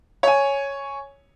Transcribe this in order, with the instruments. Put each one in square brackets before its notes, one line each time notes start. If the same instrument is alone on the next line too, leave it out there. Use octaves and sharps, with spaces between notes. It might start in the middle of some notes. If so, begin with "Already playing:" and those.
[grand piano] C#5 G#5